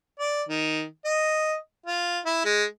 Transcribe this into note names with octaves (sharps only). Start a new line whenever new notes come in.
D5
D#3
D#5
F4
E4
G#3